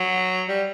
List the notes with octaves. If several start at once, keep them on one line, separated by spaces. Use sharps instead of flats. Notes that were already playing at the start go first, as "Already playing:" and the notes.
Already playing: F#3
G3